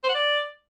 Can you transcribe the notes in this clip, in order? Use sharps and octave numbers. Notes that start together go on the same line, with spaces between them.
C5
F#5
D5